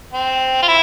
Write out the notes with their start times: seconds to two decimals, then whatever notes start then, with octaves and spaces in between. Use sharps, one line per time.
0.13 C4
0.62 F4
0.68 E4